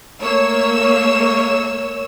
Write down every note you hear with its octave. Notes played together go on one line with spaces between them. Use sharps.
A3 A#3 C#5 E6